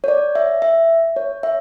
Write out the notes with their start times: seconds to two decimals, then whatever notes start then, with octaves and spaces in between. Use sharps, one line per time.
0.04 C#5
0.08 D5
0.35 E5
0.62 E5
1.16 C#5
1.43 E5